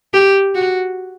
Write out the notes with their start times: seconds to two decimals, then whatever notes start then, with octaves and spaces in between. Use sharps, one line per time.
0.14 G4
0.55 F#4